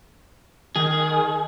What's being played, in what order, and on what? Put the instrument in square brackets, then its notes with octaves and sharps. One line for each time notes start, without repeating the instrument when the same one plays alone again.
[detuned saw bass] D#3 [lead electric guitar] G#4